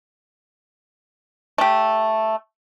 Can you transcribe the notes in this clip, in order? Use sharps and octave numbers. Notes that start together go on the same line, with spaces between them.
A3 G4